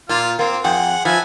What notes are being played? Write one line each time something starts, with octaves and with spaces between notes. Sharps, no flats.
A#2 F4 F6
A#3 C4
F2 G#4 F#5 G5
F3 B4 E5 G#5